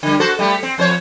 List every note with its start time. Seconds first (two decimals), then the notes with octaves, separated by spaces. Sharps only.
0.03 D3 G3
0.20 F#4 A4 C5
0.39 G3 A3 G4
0.63 C4
0.78 F2 C5 C#5